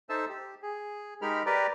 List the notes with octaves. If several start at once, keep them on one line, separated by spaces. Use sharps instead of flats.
D#4 A4 C5 E5 A5 E6
G4
G#4
G#3 D#4 G4 A#4 B5 F6
G4 A#4 B4 D5 G5 A#5